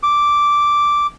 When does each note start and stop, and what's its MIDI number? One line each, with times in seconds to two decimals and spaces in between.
0.03 1.07 86